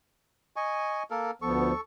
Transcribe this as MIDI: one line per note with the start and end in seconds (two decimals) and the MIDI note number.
0.56 1.03 75
0.56 1.03 80
0.56 1.03 85
1.10 1.31 58
1.10 1.31 69
1.10 1.31 70
1.42 1.72 38
1.42 1.72 53
1.42 1.72 59
1.42 1.81 69
1.42 1.81 85